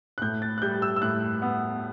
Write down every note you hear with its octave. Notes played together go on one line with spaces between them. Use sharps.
F#6
A2 G6
A6
F#6
G3 G6
E6
E6
A2 F#6
B3